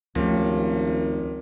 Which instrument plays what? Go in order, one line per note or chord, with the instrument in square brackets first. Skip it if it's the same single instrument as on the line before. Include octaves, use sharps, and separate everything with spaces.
[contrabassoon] G#1 [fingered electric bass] D2 A3 [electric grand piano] F3 C#4 G4 [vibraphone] A#4